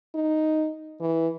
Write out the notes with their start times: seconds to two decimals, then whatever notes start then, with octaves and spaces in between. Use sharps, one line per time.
0.15 D#4
1.00 E3